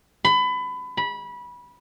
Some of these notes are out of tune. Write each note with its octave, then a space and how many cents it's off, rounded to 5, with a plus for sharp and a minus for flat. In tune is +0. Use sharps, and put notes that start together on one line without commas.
B5 +25
B5 -20